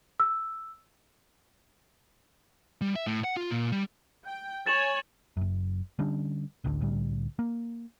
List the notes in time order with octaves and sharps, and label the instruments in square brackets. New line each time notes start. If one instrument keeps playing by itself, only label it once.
[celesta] E6
[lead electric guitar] G3
E5
A2
F#5
F4
A#2
G3
[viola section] G5
[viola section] C#5 G#5 [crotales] A6 E7 F#7
[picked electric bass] F#1 F#2
D3 G3 C#4 D4
D1 A1 D2 D3
C2 A2 D3 G3
A#3